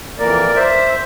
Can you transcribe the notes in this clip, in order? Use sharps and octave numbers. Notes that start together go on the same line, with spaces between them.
F2 E3 A#3 A#4 D5
C5 E5